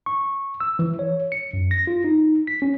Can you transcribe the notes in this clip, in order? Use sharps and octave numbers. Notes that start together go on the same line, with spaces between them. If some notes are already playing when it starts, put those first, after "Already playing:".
C#6
E6
E3
C#5
C#7
F#2
A#6
F4
D#4
B6
C#4